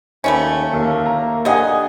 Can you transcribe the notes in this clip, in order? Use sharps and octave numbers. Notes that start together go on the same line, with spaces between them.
D#2 G3 A3 C#4
D#2 A#3
A#5
D3 G4 D#5 F#5 G#5